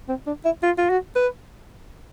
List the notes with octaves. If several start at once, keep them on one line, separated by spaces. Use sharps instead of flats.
C4
D4
E4
F4
F4
F#4
B4